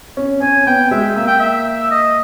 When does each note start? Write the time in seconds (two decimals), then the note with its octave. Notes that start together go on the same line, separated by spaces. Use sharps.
0.17 C#4
0.42 C#4 G#5
0.67 B3 G5
0.91 G#3 E5
1.16 A#3 E5
1.27 G5
1.39 E5
1.91 D#5